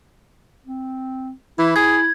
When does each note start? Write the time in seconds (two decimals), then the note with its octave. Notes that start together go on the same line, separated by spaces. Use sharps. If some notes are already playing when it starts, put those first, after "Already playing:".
0.66 C4
1.59 E3 E4
1.76 G#4 G#6